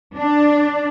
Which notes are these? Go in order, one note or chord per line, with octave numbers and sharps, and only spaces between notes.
D4